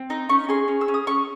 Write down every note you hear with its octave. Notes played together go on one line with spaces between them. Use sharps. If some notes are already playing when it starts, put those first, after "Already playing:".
Already playing: C4
D#4
C#4 C#6
G#4 C6
C#4
E6
C#4
D#6
C#4 C#6